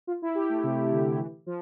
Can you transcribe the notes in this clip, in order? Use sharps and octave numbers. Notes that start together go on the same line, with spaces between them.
F4
E4
G4
A3
C3
D3
E3
F3